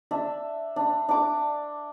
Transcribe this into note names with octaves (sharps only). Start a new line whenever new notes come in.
D4 E5
D4
D4 D6